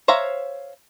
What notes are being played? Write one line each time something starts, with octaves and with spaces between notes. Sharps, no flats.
C5 C#5 E5 F5 A#5